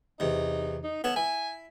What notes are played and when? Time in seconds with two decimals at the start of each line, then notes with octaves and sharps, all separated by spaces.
0.20 E2 C3 D#4
0.84 D#4
1.04 B3 A4 C#5 A5
1.16 E4 G#5